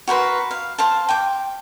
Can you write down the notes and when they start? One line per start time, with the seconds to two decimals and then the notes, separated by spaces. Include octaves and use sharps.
0.07 F#4 A#4 B4 C6
0.51 F5
0.78 C5 F5 A5
1.09 G5 D6